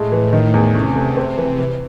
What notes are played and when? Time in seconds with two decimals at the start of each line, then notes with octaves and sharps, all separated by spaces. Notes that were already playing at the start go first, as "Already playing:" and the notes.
Already playing: A2 G#3 A3
0.12 E3
0.33 D#3
0.54 E2
0.75 C3 C#4
0.96 A3
1.17 C3 C4
1.37 E3
1.59 E3